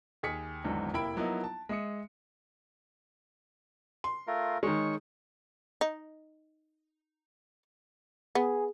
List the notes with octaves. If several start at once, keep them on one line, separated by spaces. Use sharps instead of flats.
D#2 G#4 B6 C#7
G#1 E2 G#2 D3 F#3
F1 A#3 E4 G5 B5 D7
F3 F#3 A#3 B3 D#4 E4
A5
G#3 E5 D#6 C#7
C6
A3 F4 A#4
D#3 G#3 C#5 C#6
D#4
B3 G#4